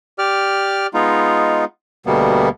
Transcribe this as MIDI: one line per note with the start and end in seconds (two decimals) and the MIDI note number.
0.19 0.87 67
0.19 0.87 74
0.19 0.87 89
0.94 1.65 56
0.94 1.65 59
0.94 1.65 63
0.94 1.65 65
2.06 2.49 38
2.06 2.49 47
2.06 2.49 55
2.06 2.49 58
2.06 2.49 59